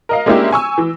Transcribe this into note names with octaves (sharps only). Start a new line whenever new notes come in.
A#4 D#5 F5
G#3 A#3 C#4 D4 E4 G4
G#5 C#6 E6
E3